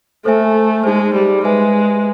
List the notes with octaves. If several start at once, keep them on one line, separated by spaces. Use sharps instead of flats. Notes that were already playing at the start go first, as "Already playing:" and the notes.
A3 A4 C5 E5 G#5
G#3 D#4 G#4 C5
G3
G#3 G#4 B4 E5 G#5